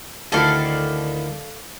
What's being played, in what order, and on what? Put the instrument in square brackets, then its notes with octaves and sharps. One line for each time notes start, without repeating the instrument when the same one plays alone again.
[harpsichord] D2 D#3 E4 [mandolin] A4 D5 F5